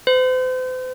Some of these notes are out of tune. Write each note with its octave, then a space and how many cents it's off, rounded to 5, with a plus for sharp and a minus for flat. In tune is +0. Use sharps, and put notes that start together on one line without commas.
C5 -40